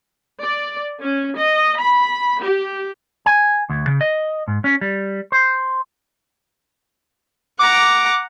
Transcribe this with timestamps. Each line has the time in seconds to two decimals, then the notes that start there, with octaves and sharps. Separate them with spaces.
0.42 D5
1.01 C#4
1.37 D#5
1.77 B5
2.42 G4
3.26 G#5
3.69 D2
3.87 C#3
4.01 D#5
4.48 G#2
4.64 C#4
4.81 G3
5.32 C5
7.59 F#5 A#5 D6